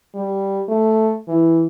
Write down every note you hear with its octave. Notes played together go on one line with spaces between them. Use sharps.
G3
A3
E3